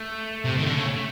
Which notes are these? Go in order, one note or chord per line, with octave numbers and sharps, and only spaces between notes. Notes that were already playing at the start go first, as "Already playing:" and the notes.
Already playing: A3
C3
D#3
D3
C#3
A3